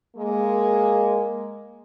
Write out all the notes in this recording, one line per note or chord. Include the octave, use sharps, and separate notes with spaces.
G#3 A#3